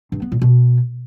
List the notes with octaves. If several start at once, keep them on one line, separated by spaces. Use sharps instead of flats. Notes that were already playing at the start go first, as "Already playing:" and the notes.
G2
B3
A#2
B2